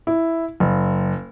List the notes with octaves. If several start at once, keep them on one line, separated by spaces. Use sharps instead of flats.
E4
F#1